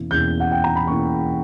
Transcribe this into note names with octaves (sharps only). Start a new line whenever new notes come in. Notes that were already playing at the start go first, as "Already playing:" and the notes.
Already playing: E2 B2 A#3 C#4 E4
E2 B2 A#3 C#4 E4 G6
F#5
G5
A#5
B5
B2 A#3 C#4 E4 C#6